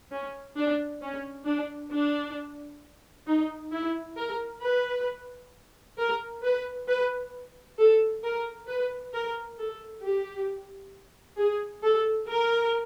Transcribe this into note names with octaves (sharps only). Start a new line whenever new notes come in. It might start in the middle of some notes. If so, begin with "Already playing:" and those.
C#4
D4
C#4
D4
D4
D#4
E4
A#4
B4
A#4
B4
B4
A4
A#4
B4
A#4
A4
G4
G#4
A4
A#4